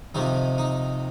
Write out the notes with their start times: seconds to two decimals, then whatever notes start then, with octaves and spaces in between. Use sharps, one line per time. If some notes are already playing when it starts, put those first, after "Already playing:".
0.14 F2 C3 D#3 D#4
0.58 D#4